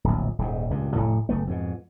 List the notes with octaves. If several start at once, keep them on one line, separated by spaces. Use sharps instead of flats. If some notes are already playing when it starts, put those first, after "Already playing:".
D1 A#1
D#1 D#2 G#2
C#2 G2 A#2
F1 E2 A2 A3
F#1 A3 B3
F2 G#2 B2